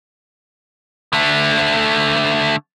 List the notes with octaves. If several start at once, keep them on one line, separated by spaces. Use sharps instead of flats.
D3 A3